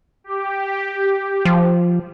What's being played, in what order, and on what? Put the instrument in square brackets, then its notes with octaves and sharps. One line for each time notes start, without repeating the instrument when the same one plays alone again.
[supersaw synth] G4
[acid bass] F3